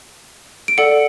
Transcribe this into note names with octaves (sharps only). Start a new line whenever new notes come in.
D7
A4 D5 F#5 C#7